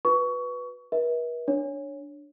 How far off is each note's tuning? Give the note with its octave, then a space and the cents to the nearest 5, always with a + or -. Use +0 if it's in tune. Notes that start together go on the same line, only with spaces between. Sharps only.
F#4 -20 B4 +0 C#6 +20
B4 -45 E5 -35
D4 +0 C#5 +0